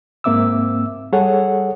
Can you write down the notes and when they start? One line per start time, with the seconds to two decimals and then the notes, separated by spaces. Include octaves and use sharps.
0.24 G#2 A#3 C4 E5 D6 E6
1.13 G3 G#4 A4 C#5 F#5